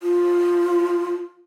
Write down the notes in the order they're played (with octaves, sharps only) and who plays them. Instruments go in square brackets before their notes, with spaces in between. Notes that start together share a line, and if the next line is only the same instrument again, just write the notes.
[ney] F4